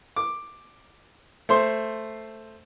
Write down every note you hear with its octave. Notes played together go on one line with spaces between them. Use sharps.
D6
A3 C5 C6